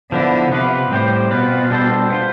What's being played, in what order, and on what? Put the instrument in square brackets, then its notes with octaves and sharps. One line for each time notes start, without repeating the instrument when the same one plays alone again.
[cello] D3 [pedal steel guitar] F3 B3 E4
[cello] C3 [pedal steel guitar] B3 F4 B4
[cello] A2 [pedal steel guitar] G3 C4 G4 C5
[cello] B2 [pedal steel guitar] C4 F4 B4
[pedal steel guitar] G3 D4 A4 C5
B3 F4 C5